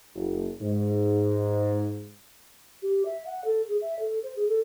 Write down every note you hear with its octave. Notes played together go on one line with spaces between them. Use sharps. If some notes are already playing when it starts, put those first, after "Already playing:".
F#1
G#2
G4
E5
F#5
A4
G#4
E5
A4
C5
G#4
A4